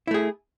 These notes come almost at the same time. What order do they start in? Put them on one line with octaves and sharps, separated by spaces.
E4 A3 G#4